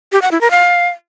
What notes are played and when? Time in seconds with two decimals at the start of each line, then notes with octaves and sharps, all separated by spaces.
0.12 G4
0.22 F#5
0.31 E4
0.41 A#4
0.51 F5